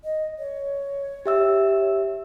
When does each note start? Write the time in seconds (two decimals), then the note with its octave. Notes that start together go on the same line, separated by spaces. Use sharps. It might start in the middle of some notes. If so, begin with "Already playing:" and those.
0.04 D#5
0.39 C#5
1.26 G4 E5 E6